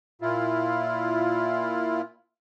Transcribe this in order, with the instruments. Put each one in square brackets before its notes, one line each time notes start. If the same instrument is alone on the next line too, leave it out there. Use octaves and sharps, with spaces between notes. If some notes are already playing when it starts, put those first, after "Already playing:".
[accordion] A#2 E4 F4